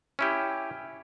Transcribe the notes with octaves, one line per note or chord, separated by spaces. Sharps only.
C#4 E4 G4